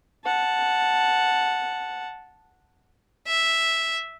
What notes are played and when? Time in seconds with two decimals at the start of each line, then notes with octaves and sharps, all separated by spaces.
0.25 F#5 A5
3.27 E5